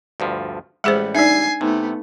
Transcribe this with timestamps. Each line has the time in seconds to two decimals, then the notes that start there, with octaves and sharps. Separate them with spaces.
0.20 D2 G2 F3
0.84 A1 G3 G#3 G#4 C5 F#5
1.15 D4 D#4 D5 E5 G#5 E6 C7
1.61 C3 A3 B3 D#4